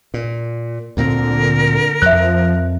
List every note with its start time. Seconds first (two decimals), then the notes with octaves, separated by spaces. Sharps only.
0.14 A#2
0.97 D2 A#2 D3 C4 A#4
2.02 F2 F3 E5 F#6